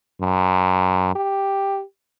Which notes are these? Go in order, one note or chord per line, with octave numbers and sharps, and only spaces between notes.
F#2
G4